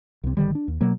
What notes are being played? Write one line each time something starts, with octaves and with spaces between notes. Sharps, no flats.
C2 C3
G#1 D3 D#3 G3
D4
D#2
B2 F#3 A#3